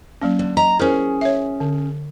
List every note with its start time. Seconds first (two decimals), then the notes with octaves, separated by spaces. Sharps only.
0.22 F#3 A#3 C#4
0.39 D3
0.57 D#5 A#5
0.79 C#4 E4 G#4 A#4 C5
1.21 C#5 E5
1.60 D3